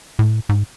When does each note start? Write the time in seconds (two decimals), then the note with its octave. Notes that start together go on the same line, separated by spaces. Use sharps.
0.19 A2
0.49 G#2